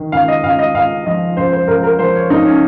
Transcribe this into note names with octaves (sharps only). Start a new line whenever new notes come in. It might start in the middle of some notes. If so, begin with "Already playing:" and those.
Already playing: D#3
C#2 F5
D#5
C#2 F5
D#5
C#2 F5
F3 D#5
C#2 C5
C5
C#2 A#4
A#4
F3 C5
C#5
C#2 D#4
C#4